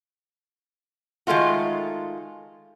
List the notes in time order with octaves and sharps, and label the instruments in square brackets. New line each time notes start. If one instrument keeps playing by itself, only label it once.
[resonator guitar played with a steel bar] D#3 G#3 A3 F4 F#4